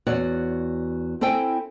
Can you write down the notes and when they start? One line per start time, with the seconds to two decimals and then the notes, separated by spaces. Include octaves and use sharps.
0.07 E2 F#4 C#5 D5 F#5
1.21 C4 E4 A4 G5 G#5